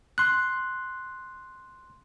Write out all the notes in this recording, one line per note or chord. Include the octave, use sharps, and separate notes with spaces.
C6 F#6